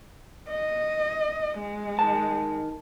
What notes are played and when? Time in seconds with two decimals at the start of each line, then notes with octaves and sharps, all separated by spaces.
0.49 D#5
1.57 G#3
1.99 D#3 A5